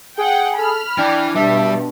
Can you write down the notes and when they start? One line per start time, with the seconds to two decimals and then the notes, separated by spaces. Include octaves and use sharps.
0.18 G#4 F#5 G5
0.58 A4 B5 F6
0.98 E3 D4 G5
1.36 G2 B2 G3 E5